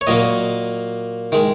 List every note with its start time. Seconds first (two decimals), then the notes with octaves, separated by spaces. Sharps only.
0.01 C#5
0.07 A#2 F#3 A#3 D#5
1.32 D#3 G#3